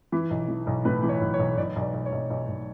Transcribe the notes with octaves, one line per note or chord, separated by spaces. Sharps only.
E3
B1
E3
B1
A2 B4
E3
C#5
B1
C#5
B1
B1 D5
B1
D5
B1
C#5
B1
B1
B1